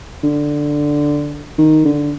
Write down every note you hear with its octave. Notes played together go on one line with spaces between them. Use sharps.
D3
D#3
D3